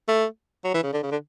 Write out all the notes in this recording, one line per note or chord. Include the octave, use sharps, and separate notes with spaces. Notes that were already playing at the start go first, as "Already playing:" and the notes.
A3
F#3
E3
C#3
D3
C#3
D3